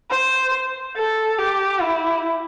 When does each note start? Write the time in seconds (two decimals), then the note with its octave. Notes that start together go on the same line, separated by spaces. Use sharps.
0.11 C5
0.96 A4
1.39 G4
1.82 E4